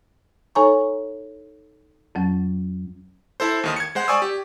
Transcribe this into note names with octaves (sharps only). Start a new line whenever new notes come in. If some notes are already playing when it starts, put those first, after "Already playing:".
D#4 A4 C#5 G#5 A#5 C#6
F2 F#3 C#4
E4 A4 C5
D#2 D#3 D#6
G#6 C#7
G#3 C5 F#5
D5 G#5 C#6 D#6 E6
G4